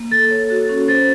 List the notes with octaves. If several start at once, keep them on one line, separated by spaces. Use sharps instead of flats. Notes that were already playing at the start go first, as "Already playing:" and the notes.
Already playing: A#3
A4 A6
C#5
F#4
C#4
C5 A6